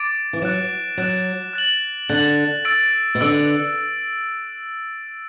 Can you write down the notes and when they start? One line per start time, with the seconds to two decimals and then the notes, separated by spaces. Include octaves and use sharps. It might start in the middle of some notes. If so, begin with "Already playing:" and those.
Already playing: D6 A6 D7
0.33 E3
0.42 F#3 F#6 A6 E7
0.98 F#3 F#6 A6 E7
1.53 F#6 A6 F#7
2.09 D3 F#6 A6 F#7
2.65 E6 A6 D7
3.15 B2
3.21 D3 E6 A6 D7